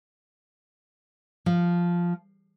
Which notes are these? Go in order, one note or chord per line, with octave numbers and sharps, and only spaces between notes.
F3